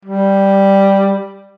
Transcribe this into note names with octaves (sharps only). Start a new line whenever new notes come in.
G3